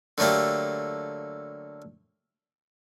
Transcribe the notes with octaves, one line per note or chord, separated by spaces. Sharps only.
D3 F#3 A3 A#3 G4